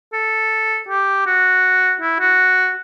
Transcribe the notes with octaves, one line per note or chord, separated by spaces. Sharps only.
A4
G4
F#4
E4
F#4